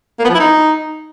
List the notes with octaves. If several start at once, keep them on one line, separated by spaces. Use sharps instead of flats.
A#3
B3
F3
E4
D#4